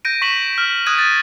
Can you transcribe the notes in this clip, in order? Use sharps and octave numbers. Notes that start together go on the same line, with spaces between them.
G6 A#6 D7 D#7
C#6 B6 E7 F#7
F6
D#6 F#6 G#6 D#7
A6